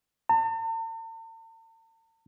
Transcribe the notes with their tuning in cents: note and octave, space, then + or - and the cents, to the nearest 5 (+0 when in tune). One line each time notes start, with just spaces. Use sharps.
A5 +45